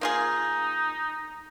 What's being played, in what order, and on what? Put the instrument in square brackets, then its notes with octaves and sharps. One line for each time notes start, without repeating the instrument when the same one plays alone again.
[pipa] A#3 F4 G#4 [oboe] D#4